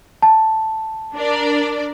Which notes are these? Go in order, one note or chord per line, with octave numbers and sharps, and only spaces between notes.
A5
D4 A#4 D5